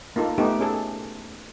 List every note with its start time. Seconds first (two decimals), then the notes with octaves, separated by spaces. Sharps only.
0.16 A#3 D#4 F4 A4
0.38 A3 B3 D#4 G4
0.59 C#4 G#4 A4